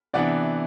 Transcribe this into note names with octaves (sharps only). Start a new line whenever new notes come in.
C3 E3 B3 D4 D5 F#5